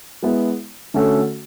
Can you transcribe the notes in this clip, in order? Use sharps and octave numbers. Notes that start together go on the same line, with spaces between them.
G#3 B3 E4
D3 A3 C#4 F#4 A4